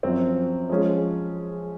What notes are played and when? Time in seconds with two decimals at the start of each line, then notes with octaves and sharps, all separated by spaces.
0.03 F#2 F3 C4
0.70 F3 G#3 C#4 G#4